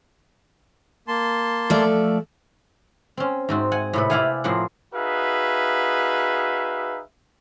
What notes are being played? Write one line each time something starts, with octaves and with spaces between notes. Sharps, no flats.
A#3 A5 C6
F3 A3 A4 D5
C4 C#4
G#2 C4 F#4
F#5 G#5
A2 C3 B4
E4 G4 D5 F5 F#5 G#5
A2 F3 A#3 C4 G#4 F#5
D#4 F#4 G#4 B4 E5 F5